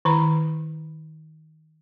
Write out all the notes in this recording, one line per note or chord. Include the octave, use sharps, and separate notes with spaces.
D#3 E4 B4 A#5 B5